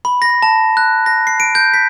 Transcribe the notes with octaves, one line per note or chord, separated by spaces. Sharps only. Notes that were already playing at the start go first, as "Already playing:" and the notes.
B5
A#6
A5
F#6
A#6
C7
D7
G6
B6